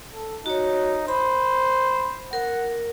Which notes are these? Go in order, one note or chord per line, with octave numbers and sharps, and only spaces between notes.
A4
D#4 F#4 C#5
C5 B5
A#4 F#5